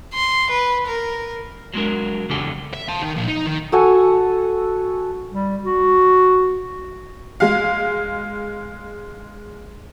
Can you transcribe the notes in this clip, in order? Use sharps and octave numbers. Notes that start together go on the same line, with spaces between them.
C6
B4
A#4
F#3 G#3 D4 A#4
E2 C#3 D4 G4 A4 G#5
E5
F5 A5
D#3
A#2 F3
D#4
D#3
F#4 A4 G#5
G3
F#4
G#3 F5